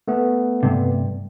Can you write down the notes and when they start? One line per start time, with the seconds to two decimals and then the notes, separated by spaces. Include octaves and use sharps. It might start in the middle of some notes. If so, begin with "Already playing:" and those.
0.08 A3 B3
0.63 G2 C3